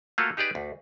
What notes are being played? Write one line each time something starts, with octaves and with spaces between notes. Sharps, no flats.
A3 A#3 F4 F#4 A4
D#4 G4 G#4 B4 D5
D2